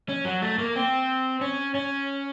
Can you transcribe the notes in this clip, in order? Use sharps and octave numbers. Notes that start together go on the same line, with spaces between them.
C#4
F#3
A3
A#3
C4
C#4
C#4